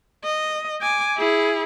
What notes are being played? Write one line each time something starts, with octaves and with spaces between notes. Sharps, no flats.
D#5
G#5 D6
E4 G#4